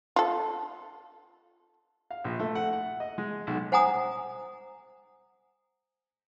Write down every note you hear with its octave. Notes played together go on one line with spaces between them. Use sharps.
F4 A4
F5
A#1
A3
F#5
F#5
D#5
G#3
B1
C5 F#5 G#5 A#5 D#6